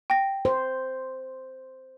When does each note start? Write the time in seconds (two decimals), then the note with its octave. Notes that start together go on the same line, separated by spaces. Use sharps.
0.10 G5 A#6
0.45 C5